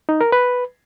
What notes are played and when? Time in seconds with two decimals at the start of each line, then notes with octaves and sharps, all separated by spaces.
0.09 D#4
0.21 A#4
0.32 B4